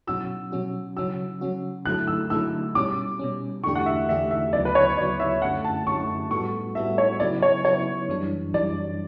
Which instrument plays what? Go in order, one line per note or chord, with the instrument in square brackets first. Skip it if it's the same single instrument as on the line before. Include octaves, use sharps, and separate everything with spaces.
[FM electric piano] B2 F#3 C#4 F#4 [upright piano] E6
[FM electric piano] B2 F#3 C#4 F#4
[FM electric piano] C#3 F#3 C#4 F#4 [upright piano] E6
[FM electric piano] C#3 F#3 C#4 F#4
[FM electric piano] D3 F#3 A3 E4 A4 [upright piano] F#6
[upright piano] E6
[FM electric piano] D3 F#3 A3 E4 A4 [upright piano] E6
[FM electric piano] B2 G3 C#4 [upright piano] D6
[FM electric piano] B2 G3 C#4
[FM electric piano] E2 D3 A3 D4 G4 [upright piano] C#6
[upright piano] F#5
E5
[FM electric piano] E2 D3 A3 D4 G4 [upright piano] E5
[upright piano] E5
[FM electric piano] D2 C#3 F#3 B3 [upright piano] D5
[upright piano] B4
C#5
[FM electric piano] D2 C#3 F#3 B3 [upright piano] D5
[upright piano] E5
[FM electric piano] F#2 D3 A3 C#4 [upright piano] F#5
[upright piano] A5
[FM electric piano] F#2 D3 A3 C#4 [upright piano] C#6
[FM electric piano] A2 G3 B3 F#4 A4 [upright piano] C#6
[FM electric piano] A2 G3 B3 F#4 A4 [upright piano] E5
[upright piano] C#5
[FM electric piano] C#3 F#3 B3 E4 [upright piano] D5
[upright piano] C#5
[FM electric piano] C#3 F#3 B3 E4 [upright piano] C#5
[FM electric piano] F#2 E3 G3 D4
[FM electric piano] F#2 E3 G3 D4 [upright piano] D5